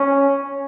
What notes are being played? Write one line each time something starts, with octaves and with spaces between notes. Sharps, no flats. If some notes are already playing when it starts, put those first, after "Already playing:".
Already playing: C#4